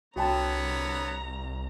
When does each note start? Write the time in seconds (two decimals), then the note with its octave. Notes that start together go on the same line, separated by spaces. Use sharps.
0.16 C2 D3 B3 F#4 C#5 G5 A5 A#5